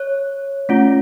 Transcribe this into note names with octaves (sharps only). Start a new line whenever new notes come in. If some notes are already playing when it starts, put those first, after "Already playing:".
Already playing: C#5
A3 C#4 F4